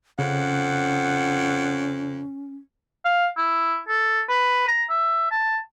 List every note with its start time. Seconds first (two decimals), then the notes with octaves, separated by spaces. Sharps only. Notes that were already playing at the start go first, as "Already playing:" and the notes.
0.19 F2 C#3 C#4 F#5
3.05 F5
3.37 E4
3.88 A4
4.29 B4
4.68 A#5
4.89 E5
5.31 A5